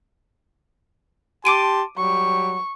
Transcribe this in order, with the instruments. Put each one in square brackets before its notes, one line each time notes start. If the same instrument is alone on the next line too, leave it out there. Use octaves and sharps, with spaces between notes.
[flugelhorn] G4 [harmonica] A5 C6 [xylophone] D6 D7 D#7
[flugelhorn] F#3 [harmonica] G3 [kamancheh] C#6